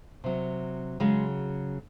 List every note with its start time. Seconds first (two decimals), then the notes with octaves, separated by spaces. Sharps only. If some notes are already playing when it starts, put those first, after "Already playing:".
0.24 C3 F#3
1.00 C#3 F#3 G#3